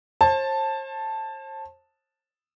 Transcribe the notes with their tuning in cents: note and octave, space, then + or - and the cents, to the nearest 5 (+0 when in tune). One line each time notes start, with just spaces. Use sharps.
C5 +40 A5 +0